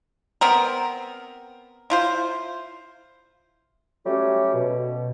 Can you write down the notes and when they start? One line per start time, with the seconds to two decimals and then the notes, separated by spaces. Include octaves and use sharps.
0.41 B3 C4 A#4
1.90 E4 F4 C5
4.06 F#3 G3 A3 C#4 G4
4.54 B2